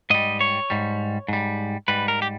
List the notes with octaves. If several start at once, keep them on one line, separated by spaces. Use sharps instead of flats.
G#2 G3 D#5
C#5
G#2 G3
G#2 G3
G#2 G3 B4
A#4
G4